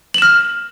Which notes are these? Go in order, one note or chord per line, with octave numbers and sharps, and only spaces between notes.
F6 E7 F#7